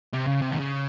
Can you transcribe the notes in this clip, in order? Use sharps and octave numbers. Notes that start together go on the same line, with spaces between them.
C3
C#3
C3
D#3
C#3